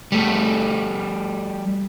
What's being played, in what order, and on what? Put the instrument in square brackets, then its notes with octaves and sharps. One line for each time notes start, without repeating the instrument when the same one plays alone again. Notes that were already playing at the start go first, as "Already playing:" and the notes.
[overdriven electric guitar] G3 A3